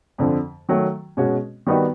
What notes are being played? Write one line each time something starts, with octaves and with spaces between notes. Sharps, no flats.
F2 D3 F3
D#3 F#3 A3
B2 G#3 C#4 F#4
D#3 G3 B3 D#4 F#4